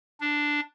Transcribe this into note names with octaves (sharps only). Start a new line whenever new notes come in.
D4